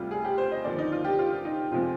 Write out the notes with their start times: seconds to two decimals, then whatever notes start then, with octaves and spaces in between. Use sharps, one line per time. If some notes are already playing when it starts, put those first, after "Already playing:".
Already playing: D2 C3 G3 F4
0.11 G#4
0.25 G4
0.38 C5
0.51 D#5
0.64 D#2 D3 F3 D5
0.78 D#4
0.92 F4
1.04 G4
1.19 F4
1.45 D#4
1.71 F2 C3 F3 G#3 F4